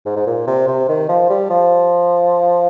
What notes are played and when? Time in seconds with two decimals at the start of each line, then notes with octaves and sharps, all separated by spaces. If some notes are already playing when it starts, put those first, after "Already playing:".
0.06 G#2
0.16 G#2
0.27 A#2
0.47 C3
0.68 C3
0.89 D#3
1.09 F3
1.30 G3
1.50 F3